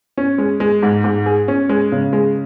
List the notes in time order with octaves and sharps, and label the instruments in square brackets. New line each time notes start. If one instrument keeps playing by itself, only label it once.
[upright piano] C#4
G#3
G#3
G#2
G#2
G#4
C#4
G#3
C#3
G#3